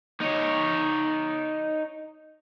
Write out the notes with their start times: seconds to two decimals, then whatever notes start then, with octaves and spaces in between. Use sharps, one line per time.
0.20 D#4 C#5